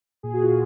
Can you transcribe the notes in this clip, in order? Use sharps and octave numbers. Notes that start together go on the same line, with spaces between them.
A#2 G#4
F#4
F4